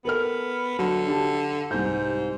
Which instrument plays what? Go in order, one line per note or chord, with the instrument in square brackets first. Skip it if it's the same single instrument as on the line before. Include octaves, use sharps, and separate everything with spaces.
[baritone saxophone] B3 [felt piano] A4 A#4 F6
[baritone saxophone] D3 [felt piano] F#3
[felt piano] D4 G4 A5
[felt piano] C2 G6 [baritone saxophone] G#2